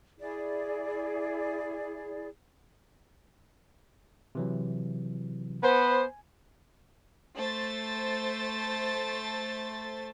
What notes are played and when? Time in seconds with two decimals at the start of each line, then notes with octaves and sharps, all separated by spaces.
0.19 E4 G#4 D5
4.35 C3 E3 F#3
5.63 B3 B4 C5 G#5
7.36 A3 C5 A6